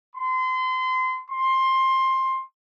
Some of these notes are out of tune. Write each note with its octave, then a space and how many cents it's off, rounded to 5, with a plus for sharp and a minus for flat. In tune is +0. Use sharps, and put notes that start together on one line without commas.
C6 -30
C6 +15